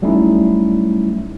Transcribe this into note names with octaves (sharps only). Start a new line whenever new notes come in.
F#3 G3 A3 C#4 D#4 E4